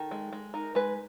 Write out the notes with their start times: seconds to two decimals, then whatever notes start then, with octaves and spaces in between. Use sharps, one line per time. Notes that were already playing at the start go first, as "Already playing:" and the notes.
Already playing: D#3 A4
0.11 G#3
0.33 G#3
0.54 D#4 A#4
0.75 G#3 B4